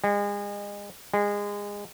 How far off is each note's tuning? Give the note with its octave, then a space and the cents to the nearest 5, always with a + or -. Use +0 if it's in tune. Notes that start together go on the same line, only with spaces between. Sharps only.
G#3 -35
G#3 -25